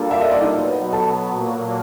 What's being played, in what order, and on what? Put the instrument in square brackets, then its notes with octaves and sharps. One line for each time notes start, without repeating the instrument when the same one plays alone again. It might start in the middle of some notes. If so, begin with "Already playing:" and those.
Already playing: [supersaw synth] G3 A#3 D4 F4 A4
[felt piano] E5
D#5
D5
D#4 D#5
[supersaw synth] B2 F#3 B3
[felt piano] A4 A5
[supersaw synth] A#2 F#3 A#3